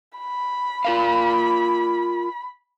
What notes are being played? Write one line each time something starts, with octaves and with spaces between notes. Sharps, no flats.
B5
F4 A#4 F5